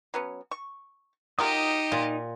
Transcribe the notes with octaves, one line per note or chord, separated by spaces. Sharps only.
F#3 B3 C#4
C#6
F#3 D#4 F4 G4 A#4 D#5 D#6
A#2 F4